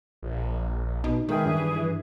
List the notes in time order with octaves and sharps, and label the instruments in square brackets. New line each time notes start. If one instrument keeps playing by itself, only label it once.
[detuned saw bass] A#1
[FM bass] B2 [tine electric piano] D#4
[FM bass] D#3 [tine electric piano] G#3 A#4 G5 [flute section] G#4 B4 E5
[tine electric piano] G2 D4 [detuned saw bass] E3